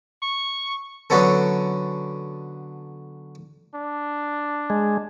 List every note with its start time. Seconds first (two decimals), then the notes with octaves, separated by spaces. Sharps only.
0.22 C#6
1.10 D3 F#3 B3 C#4 A4
3.75 D4
4.70 G#3